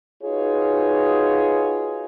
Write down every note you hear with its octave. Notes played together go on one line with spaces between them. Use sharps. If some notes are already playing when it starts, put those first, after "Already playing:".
D#4 F4 F#4 G#4 B4 C#5